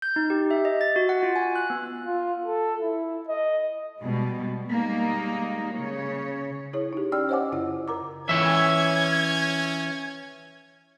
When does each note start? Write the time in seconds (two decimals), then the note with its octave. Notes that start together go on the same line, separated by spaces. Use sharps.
0.02 G6
0.16 D#4
0.30 G4
0.51 E5
0.65 D#5
0.81 A6
0.96 F#4
1.09 F#5
1.23 F4
1.36 G#5
1.55 F#6
1.70 B3
2.06 F4
2.46 A4
2.81 E4
3.28 D#5
4.01 B2 G3 G#3
4.68 G3 G#3 A#3 D#4
5.74 C#3 C#5
6.73 E4 G#4 C#5
6.93 D#4 G4
7.12 C#4 D5 G5 E6 F6
7.29 C5 C#5 D#5 F#5 G#5 D6
7.52 F#2 C#3 E4 E6
7.88 A#4 A#5 D6
8.29 E3 C#4 C#5 E5 G#6